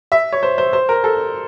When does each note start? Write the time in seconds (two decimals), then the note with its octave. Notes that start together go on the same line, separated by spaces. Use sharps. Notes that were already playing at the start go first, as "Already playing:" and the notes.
0.12 E5
0.32 C#5
0.43 C5
0.58 C5
0.73 C5
0.89 A#4
1.04 A4